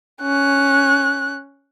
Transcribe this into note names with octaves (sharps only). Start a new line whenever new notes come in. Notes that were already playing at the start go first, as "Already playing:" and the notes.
C#4 F#6